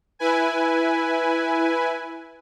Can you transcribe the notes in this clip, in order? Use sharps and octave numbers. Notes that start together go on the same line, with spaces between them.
E4 B4 G#5